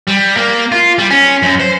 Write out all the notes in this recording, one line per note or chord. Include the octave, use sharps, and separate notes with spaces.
G3
A#3
F4
G3
C#4
F#2
C5